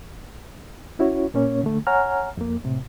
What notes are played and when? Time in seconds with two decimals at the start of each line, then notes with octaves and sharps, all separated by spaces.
0.99 C#4 E4 F#4 C#5
1.34 A#2 A#3 C#4 C#5
1.63 D3 A3
1.87 C#5 F#5 G#5 A#5 F6
2.37 F2 A#3
2.64 A2 C3